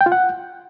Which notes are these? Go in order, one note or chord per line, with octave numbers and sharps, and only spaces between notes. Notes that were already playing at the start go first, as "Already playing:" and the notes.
G5
F4
F#5